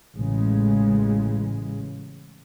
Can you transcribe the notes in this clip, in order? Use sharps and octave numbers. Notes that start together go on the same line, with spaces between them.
A1 C#3 G#3